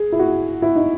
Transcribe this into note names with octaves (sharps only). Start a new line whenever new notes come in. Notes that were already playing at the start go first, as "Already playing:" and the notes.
Already playing: G#4
E4
F#4
E4
D#4